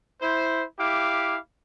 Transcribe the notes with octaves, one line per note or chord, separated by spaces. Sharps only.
E4 C5
E4 G4 F5 D6